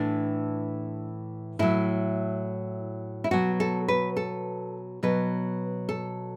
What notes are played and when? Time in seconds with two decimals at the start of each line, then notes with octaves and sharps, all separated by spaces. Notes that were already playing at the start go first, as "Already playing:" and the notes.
Already playing: A2 E3 D4
1.59 A2 F#3 E4
3.24 E4
3.31 B2 F#3 F#4
3.60 A4
3.88 B4
4.17 A4
5.03 B2 F#3 B4
5.89 A4